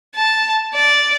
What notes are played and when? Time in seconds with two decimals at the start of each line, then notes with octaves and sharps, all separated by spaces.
0.15 A5
0.74 D5